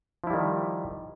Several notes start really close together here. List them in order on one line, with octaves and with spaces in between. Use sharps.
F3 E4 G3 D#3